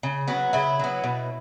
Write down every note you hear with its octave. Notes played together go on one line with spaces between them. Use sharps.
C#3
F#3 B3 F#4
C#3 E4
F#3 B3
B2